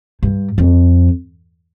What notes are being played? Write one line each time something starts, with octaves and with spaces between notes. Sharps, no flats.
G2
F2